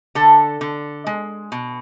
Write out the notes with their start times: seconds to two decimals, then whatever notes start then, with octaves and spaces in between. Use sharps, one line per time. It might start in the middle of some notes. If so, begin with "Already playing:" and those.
0.15 D3 A4
0.61 D3
1.07 G#3
1.52 B2